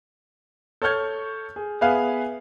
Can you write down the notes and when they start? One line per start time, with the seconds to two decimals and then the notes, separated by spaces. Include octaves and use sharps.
0.82 A4 C#5 C#6 F6 G6 G#6
1.56 G#4
1.81 B3 G#4 B4 E5 F5 G#5